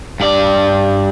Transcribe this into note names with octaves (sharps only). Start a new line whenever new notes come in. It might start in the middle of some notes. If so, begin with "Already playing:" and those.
G2 D5